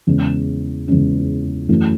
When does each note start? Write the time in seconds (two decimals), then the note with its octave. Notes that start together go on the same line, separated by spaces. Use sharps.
0.07 E2 C#3 G#3 C#4
0.88 E2 C#3 G#3 C#4
1.69 F#2 E3 A3